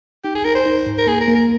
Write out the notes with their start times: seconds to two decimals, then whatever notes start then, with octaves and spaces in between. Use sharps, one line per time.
0.24 D#4 G4
0.35 G#4
0.44 D#4 A#4
0.55 C5
0.66 D#4
0.86 G#2
0.98 A#4
1.07 A#3 G#4
1.21 A#4
1.28 A#3
1.35 A#4